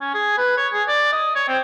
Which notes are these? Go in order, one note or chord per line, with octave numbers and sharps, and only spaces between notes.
C#4
G#4
B4
C#5
G#4
D5
D#5
C#5
C4